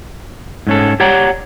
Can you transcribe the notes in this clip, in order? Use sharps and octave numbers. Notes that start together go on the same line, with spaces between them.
G#2 C#4 A4
G4 C#5 D5 F#5 A#5